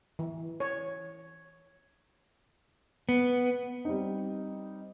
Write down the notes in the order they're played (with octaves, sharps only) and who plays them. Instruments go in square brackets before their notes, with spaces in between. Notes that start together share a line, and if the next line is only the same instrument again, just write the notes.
[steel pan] E3
C#5
[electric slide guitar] B3
[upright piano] G3 C4 D#4